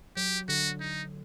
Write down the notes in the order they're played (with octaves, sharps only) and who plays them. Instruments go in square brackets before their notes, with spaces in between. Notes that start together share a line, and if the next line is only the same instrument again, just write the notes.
[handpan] F#3 [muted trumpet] G4
[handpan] D3 [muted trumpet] F#4
[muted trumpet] D#4